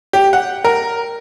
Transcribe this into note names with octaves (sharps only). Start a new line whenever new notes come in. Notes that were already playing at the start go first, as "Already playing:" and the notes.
G4
F#5
A#4